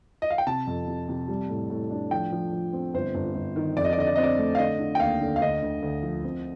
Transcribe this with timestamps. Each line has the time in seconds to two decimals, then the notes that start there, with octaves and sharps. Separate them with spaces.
0.22 D#5
0.30 F5
0.38 G5
0.47 C3 A5
0.67 F2
0.88 C3
1.09 C3
1.28 G3
1.49 A2
1.70 A2
1.91 D4
2.11 F3 G5
2.32 F3
2.52 F3
2.73 C4
2.94 G1 C5
3.15 G1
3.35 G1
3.56 D#3
3.76 F2 D5
3.85 D#5
3.93 D5
3.97 D3 D#5
4.07 D5
4.16 C4 D#5
4.23 D5
4.38 A3
4.55 F5
4.58 D3 D#5
4.79 D3
4.95 G5
5.00 D#2 F5
5.21 D3
5.36 F5
5.41 D2 D#5
5.62 D2
5.83 D2
6.03 F3
6.24 C4